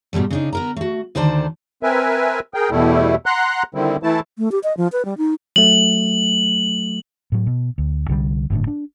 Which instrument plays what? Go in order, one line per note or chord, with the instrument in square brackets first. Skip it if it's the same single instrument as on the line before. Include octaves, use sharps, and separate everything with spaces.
[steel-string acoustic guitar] G#2 B2 F#3 G3 A3
C#3 D4 D#4
B3 A#4 A#5
A3 F#4
D2 D3 D#3 C5 D5 A5
[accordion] C4 A#4 B4 E5 G#5
G#4 A#4 G5
E2 B2 G3 A3 E4
F#5 A#5 C6 F#6
D3 D#3 G3 C4 E4
E3 A3 E4 A5
[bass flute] A3
G4
D#5
F3
B4
G3
D#4
[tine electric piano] F#3 A3 [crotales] F#7
[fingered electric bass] A2 F#3
B2
D2
C2 D3 D#3 G3
G1 A2 D3
D4